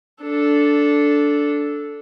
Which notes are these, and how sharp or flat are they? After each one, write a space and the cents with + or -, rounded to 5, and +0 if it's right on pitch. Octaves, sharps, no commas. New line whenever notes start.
D4 -10 A4 +0